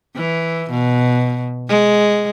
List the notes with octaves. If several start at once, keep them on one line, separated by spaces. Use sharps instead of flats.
E3
B2
G#3